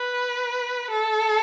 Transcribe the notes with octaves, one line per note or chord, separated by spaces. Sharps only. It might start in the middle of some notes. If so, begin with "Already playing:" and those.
Already playing: B4
A4